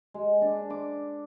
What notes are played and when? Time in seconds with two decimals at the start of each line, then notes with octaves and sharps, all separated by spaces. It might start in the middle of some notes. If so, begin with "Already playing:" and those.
0.14 G#3
0.42 D4
0.70 D6